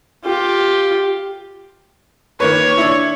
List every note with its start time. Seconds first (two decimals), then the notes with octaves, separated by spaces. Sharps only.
0.25 F4 G4
2.40 D#3 A#3 B4 C#5
2.77 D4 E4